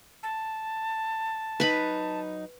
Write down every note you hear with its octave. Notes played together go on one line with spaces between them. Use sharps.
A5
F#3 D#4 B4 B5